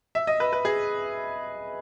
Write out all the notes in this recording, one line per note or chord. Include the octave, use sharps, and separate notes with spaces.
E5
D#5
B4
B4
G#4